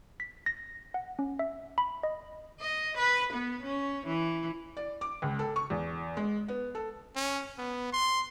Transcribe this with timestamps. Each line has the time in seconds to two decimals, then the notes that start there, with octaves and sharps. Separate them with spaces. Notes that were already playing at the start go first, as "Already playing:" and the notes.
0.20 B6
0.46 A#6
0.94 F#5
1.19 C#4
1.39 E5
1.78 B5
2.03 D#5
2.60 D#5
2.98 B4
3.34 B3
3.63 C#4
4.06 E3
4.77 D5
5.01 D6
5.22 C#2
5.39 A4
5.56 C#6
5.70 E2
6.17 G#3
6.48 B3
6.75 A4
7.16 C#4
7.58 B3
7.93 C6